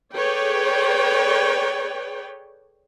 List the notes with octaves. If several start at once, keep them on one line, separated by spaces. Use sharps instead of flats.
G#4 A4 B4 C#5 D5 G5